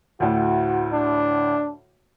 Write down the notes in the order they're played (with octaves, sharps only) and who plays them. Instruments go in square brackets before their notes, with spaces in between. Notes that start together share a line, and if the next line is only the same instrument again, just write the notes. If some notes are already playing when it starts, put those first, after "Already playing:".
[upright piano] D2 A2 [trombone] F#4
[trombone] D4